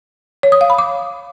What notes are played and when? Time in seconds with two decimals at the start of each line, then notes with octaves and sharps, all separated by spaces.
0.43 C#5
0.52 D#6
0.61 F5
0.70 B5
0.78 D6